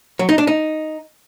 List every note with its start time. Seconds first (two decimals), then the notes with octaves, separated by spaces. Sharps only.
0.19 F#3
0.29 D#4
0.38 D4
0.47 D#4